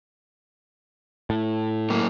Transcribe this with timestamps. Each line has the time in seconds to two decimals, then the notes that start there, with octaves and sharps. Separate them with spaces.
1.30 A2
1.90 F#2 A#3